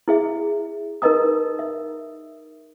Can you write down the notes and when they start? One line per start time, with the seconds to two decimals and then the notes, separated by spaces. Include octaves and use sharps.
0.08 E4 G#4 E5
1.02 D#4 A#4 B4 D#5 A#5 D#6
1.59 E5